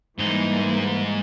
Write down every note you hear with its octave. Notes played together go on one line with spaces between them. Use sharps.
G#2 E3 G3 A#3 D#4